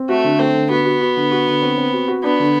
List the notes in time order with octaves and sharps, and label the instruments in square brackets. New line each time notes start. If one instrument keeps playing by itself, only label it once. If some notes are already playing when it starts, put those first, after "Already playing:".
Already playing: [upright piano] C4
[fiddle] A3 [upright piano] F#4
[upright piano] D3
[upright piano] A3 [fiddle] C4
[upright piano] D3
[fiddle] B3 [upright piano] F#4
[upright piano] F#4
F#4
D3
F#4
D3
C4
C4
F#4
F#4
[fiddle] B3 [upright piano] D4
[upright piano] D3